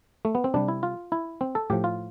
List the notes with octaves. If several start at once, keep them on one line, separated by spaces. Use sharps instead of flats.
A3
B3
C4
C3 G3 D4
E4
F4
E4
C4
A4
A2 F3 G4
F4